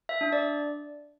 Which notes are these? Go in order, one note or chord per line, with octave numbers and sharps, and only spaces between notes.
E5
D4
D5